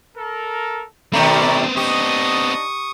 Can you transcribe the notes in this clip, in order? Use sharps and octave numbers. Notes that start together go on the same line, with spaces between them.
A4 A#4
B2 D#3 A3 B3 C4 D5 A#5 B5
D4 D#4 G4 D#5 C#6 D#6